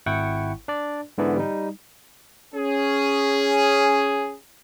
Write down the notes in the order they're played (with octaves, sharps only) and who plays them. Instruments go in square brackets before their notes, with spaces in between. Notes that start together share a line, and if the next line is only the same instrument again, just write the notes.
[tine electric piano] G#1 E4 F#5 G5 C#6
D4 D5
G#2 D3 E3 B3
G3 D#4
[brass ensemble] C#4 G#4